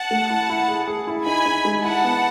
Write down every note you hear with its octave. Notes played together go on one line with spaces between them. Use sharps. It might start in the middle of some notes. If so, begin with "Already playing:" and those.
Already playing: F#5 A5
A3
E4
E4
G#4
G#4
E4
D#4 G#5 B5
D#4
G#3
E4 F#5 A5
B3